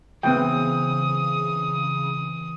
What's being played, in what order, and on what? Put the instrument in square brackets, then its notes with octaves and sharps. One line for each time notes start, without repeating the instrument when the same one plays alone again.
[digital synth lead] C#3 [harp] E3 C4 E4 [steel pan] B3 G5 [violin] D#6